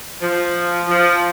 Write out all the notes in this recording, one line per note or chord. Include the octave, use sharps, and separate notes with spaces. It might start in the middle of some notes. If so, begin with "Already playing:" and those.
F3
F3